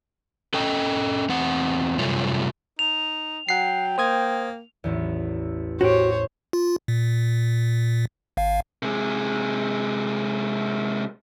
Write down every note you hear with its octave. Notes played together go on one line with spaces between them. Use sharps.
C#4 A4 D#5 G5
E2 C4 F#5
F#2 C3 G3 A3 F4 C#5
D#4 F7
F#3 F#5 G5 C7
A#3 C5 D#6 G#6
A1 E2
A2 F#4 G4 C5 C#5
F4
A#2
G#1 F5
C3 G#3